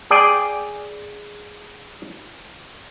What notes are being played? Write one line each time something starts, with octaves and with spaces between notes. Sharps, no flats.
G#4 D5 G5 G#5